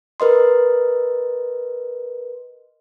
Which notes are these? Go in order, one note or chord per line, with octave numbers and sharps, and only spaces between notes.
A#4 B4 D#5 C6